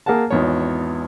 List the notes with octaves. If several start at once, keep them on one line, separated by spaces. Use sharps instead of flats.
A#3 G#4 A#4 F#5 A5
G#1 E2 C#5